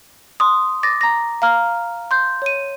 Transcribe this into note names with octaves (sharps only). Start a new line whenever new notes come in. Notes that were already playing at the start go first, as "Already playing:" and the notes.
C6 D#6
D6 A6 A#6
A#5 A#6
F5 A#5 F6
C6 G6
C#5 D#7